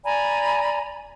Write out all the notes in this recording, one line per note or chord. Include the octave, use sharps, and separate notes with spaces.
D5 G#5 A#5 B5